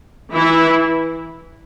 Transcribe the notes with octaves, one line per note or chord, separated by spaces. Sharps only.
E3 E4